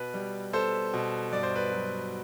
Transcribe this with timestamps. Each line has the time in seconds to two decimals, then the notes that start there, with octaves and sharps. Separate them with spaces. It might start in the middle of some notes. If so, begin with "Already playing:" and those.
Already playing: B2 B4
0.14 G3
0.53 B3 A4 C5
0.93 B2
1.32 G2 D5
1.43 C5
1.55 B4 D5
1.72 F#3